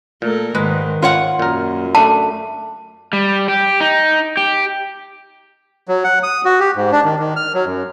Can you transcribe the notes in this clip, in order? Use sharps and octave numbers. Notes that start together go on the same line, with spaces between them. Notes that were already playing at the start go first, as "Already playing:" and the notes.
A#2 A3 A4 A#4
G#2 D#3 G#3 B4
G#2 F4 C#5 F#5
F#2 A#2 A#4
A3 D4 A5
G3
G4
D#4
G4
F#3
F#5
D#6
F#4
G4
G#2
D4
D#3
D#3
F6
F#3
F#2